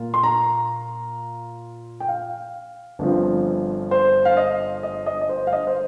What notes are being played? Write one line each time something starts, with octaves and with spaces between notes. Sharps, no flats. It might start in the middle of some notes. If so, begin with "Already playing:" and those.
Already playing: A#2 A#3 F4
C6
A#5
G5
F5
G1 G2 F3 C4
C5
F5
D#5
D#5
D#5
D#5
C5
F5
D#5
C5